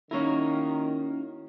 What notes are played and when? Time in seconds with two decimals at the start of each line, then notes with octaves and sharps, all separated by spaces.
0.11 D#3 A#3 C#4 E4 F#4 A#4 C#5